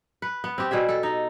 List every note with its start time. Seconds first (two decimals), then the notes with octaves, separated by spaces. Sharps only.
0.22 B4
0.44 B3
0.58 C4 G4
0.71 B2 G3 G#4 E5
0.89 A4
1.03 D#4